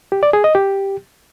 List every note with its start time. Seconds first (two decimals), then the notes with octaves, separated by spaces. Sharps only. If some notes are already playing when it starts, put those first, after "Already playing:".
0.12 G4
0.23 D5
0.33 G#4
0.44 D#5
0.55 G4